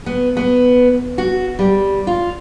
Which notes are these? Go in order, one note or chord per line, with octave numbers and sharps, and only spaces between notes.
B3
B3
F#4
G3
F4